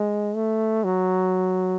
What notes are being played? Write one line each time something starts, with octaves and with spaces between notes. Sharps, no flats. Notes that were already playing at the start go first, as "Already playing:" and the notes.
Already playing: G#3
A3
F#3